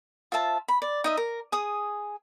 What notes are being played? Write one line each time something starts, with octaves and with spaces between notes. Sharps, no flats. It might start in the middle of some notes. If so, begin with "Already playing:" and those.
F4 C5 E5 A5
B5
D5
D#4 D#5 E5
A#4
G#4 D#6